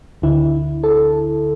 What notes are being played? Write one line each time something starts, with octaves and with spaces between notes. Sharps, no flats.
D2 D3 E4
A4